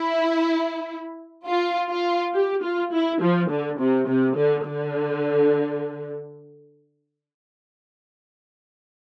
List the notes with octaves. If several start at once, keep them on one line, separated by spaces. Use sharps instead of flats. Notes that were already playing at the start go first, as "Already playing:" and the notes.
Already playing: E4
F4
F4
G4
F4
E4
F3
D3
C3
C3
D3
D3